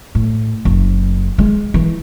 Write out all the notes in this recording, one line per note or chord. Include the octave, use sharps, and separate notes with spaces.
A2
F#1
G#3
E3